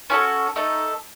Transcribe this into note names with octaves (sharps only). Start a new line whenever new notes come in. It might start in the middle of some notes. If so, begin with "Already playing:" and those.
C#4 F#4 A4 G#5
A3 D#4 A4